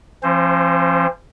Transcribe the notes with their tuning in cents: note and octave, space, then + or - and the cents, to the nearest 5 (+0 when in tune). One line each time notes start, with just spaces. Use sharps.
F3 -30 C4 +45 C5 +0